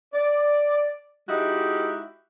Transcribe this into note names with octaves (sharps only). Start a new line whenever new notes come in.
D5
G#3 D#4 E4 F#4 G4